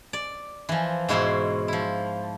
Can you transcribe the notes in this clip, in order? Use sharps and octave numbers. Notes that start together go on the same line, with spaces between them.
D5
E3 F3
G#2 B2 E4 C5 C#5 C6
F3 E4